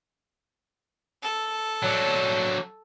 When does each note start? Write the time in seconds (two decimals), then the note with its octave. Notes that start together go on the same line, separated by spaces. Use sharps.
1.22 A4
1.83 F#3 D4